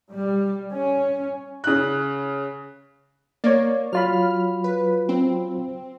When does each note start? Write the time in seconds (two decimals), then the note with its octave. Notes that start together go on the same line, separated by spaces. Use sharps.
0.13 G3
0.72 C#4
1.64 C#3 F#6
3.44 A#3 C#5 D5
3.93 F#3 F4 B5 F6
4.64 B4
5.09 C4